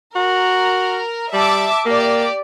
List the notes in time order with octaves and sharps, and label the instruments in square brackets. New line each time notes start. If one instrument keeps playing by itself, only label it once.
[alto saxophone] F#4 [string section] A#4
[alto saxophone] G3 [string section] E5 A5 D6
[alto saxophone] A#3 [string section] G4 D5